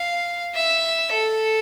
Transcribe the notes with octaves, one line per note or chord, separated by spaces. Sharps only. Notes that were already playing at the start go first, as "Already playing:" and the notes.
Already playing: F5
E5
A4